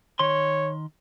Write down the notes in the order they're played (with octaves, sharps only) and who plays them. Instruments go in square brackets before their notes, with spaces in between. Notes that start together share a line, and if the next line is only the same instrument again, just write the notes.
[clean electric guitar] D#3 C6 [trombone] C#5